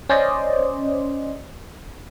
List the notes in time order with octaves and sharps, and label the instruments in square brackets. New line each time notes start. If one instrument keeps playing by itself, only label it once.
[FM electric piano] C#4 C5 D5 D#5